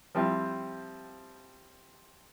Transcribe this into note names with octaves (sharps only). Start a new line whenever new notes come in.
F3 G3 C4 E4